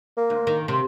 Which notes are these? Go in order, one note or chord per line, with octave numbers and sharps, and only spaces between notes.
A#3
D2
D#3
C3